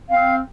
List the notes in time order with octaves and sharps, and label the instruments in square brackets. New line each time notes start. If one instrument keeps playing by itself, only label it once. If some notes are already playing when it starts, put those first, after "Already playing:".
[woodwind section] C4 F5